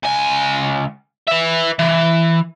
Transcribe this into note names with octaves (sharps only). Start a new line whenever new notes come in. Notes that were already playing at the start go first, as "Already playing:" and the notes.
C#2 G#5
B4 E5
E3